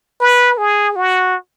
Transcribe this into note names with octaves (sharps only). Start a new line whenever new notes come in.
B4
G#4
F#4